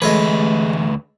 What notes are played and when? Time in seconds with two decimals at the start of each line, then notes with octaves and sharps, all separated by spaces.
0.02 D2 E3 G#3 A3 G4 A4 B4 C#5